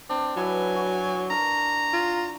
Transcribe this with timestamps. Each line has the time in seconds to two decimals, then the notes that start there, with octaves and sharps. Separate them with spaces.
0.09 C4 D4
0.37 F#3 E4 B4 G#5
0.75 F#4
1.30 D4 A#4 A#5
1.93 F4